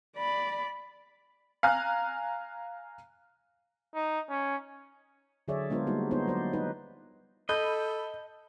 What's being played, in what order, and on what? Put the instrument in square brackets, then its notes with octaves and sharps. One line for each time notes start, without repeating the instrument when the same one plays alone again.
[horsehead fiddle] D5 B5
[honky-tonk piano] F5 G#5 A#5 F6 F#6
[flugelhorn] D#4
C#4
[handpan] D3 F#3 G#4 C#5 D5 E5
G#3 B3 D4 F4 A#4 C5
G3 A#3 D#4 F#4
B3 D#4 F4 C5 C#5
F#3 C5 D5
D#4 B4
[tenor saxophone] A4 [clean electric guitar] D#5 [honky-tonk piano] B5 G6